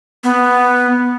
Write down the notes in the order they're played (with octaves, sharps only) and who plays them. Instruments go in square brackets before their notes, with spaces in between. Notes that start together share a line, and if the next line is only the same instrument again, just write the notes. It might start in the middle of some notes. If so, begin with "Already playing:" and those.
[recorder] B3